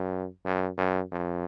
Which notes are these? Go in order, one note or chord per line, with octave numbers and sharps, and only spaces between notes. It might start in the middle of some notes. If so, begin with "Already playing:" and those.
Already playing: F#2
F#2
F#2
F2